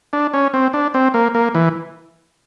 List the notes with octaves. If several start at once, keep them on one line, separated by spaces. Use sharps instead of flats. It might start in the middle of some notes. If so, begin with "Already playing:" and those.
D4
C#4
C4
D4
C4
A#3
A#3
E3